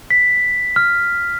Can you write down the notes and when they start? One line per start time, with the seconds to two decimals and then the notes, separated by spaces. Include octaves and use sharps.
0.10 B6
0.76 F6